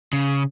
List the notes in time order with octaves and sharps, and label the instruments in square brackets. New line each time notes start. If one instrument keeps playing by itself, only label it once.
[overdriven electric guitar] C#3